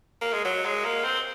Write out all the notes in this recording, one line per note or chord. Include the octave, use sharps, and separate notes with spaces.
A#3
G#3
F#3
G#3
A#3
C4